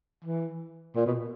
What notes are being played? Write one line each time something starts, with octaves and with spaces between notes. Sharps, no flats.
E3
A#2
B2